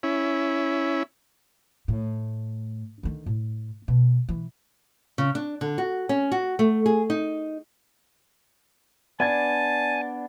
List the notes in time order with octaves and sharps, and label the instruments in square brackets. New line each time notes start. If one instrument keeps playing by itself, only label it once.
[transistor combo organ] C#4 E4
[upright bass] A2
D3 D#3
A2
B2
E3
[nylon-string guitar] C#3
D4
D3
F#4
C#4
F#4
A3
G#4
D#4
[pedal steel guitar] B3 D4 [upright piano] D5 G#6 A6 [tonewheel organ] G#5 [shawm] A5